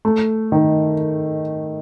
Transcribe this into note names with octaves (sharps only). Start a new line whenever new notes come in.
A3
D#3